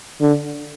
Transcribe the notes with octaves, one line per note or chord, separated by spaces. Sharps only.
D3